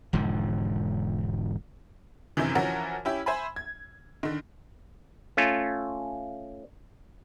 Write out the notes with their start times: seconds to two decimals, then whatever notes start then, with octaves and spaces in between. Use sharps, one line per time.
0.13 E1 G#2 D3 F3
2.37 F#1 F#2 C3 D#3 E3
2.55 E3 F3 C#4 F#4 A#4
3.05 C#4 E4 G4
3.26 C5 E5 G#5 B5
3.56 G#6
4.23 D3 D#3
5.37 A3 C#4 F4